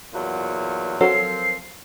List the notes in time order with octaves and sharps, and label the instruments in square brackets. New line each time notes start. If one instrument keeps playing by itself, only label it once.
[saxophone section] E2 A#2 F#3
[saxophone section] F3 C4 [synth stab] F#3 [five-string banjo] A4 A#4 C#5 [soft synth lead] C7